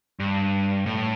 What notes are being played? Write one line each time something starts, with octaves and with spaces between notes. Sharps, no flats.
G2
A2